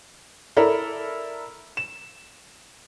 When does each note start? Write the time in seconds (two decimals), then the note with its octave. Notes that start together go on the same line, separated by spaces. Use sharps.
0.56 E4 A4 A#4 D5 A#5
1.77 E7